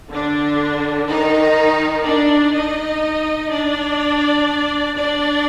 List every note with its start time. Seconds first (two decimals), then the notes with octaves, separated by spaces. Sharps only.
0.11 D3 D4
1.09 D#3 D#4
2.06 D4 D5
2.55 D#4 D#5
3.52 D4 D5
4.98 D4 D5